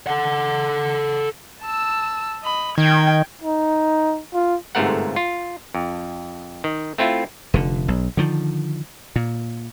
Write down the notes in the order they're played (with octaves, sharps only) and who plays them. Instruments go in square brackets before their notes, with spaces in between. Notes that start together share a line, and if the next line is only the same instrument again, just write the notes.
[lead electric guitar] A4 F#5
[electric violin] A5 E6
D#5 B5
[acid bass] D#3 [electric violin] G5 G#6
[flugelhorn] D#4
F4
[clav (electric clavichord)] G1 G#2 C3 A3 A#4 F#5
F4
F2
D#3
A3 C4 E4 F4
[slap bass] F1 D3
B1
D3 D#3 F3
A#2